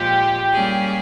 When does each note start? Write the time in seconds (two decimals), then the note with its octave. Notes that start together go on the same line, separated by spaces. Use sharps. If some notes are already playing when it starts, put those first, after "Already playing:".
Already playing: A#2 F3 G#3 G4
0.54 G3 A#3 C#4 G#4